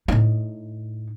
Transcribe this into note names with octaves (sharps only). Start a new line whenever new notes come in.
A2 D#4